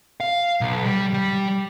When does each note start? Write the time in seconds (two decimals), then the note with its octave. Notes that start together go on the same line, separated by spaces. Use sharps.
0.20 F5
0.61 B1
0.85 G3
1.14 G3